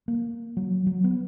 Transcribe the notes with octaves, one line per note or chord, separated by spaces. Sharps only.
A#3
F#3
F#3
B3